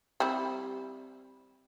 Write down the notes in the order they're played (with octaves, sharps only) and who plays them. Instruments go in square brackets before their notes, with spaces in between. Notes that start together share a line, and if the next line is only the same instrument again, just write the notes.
[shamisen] G3 C4 E4